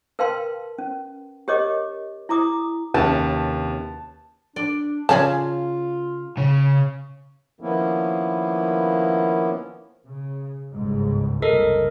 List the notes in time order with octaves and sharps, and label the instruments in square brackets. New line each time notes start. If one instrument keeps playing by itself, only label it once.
[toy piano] A#4 B4 F5 G5 A5 C6
C#4
G4 A#4 C#5 D#5 D6
E4 A#5 D6 D#6
[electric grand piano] D#2 [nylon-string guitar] C3 C#4 [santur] A5
[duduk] D4 [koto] D5
[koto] C#3 C#4 G#4 [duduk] F4 [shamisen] D5 G#5 A5
[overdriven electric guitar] C#3
[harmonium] D#3 F3 A#3 B3 C#4 E4
[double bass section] C#3
G1 C#2 G#2
[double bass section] F#1 C2 [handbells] A4 A#4 D#5